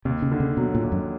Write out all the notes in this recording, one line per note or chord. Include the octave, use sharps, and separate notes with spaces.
D#2 C3
C#3
D3
C#3
B2 F#3
A#2
D#2
F#2